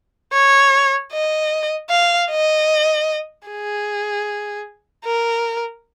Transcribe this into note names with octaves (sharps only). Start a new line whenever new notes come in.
C#5
D#5
F5
D#5
G#4
A#4